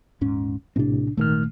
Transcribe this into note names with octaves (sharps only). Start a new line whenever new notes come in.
D#1 G#2 C#4
A#1 A2 C3 C4 D4
G#1 A#2 D#3 A3 F6